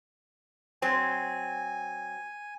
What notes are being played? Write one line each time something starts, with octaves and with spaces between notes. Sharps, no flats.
F#3 C4 G#5